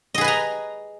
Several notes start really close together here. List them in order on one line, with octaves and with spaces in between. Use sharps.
D#5 G#4 B4 G#5 A#5